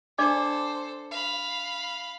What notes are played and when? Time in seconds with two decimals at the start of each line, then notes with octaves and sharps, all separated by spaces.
0.18 D4 A4 C5 D5 D6
1.11 F5 B5